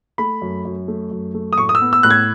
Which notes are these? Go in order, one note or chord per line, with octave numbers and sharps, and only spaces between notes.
A3 B5
F#2
F#2
A3
F#2
A3
D#6
A2 C#6
D#6
E6
B3
E6
A2 F#6
G#6